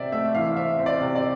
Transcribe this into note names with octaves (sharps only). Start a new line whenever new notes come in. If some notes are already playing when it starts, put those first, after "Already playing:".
Already playing: C3 C4 D5 E5
A3 E5
E3 F5
C4 E5
C4
D5
C3
D5